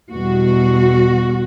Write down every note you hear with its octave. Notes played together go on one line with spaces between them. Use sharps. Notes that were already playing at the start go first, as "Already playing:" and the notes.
E2 B2 G3 F#4